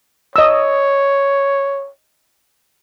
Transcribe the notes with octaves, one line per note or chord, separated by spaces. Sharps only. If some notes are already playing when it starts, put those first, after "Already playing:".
C#5 D#5 E6